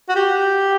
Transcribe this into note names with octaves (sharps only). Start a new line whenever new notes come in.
F#4
G4